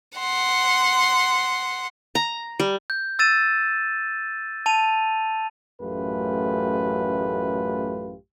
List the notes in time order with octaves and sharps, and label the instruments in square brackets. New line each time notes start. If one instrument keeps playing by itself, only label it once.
[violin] F#5 C6
[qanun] A#5
G3
[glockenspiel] G6
E6 A6 D#7 E7
A5 D#7 F7
[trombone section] A1 F#2 A3 F4 G4 B4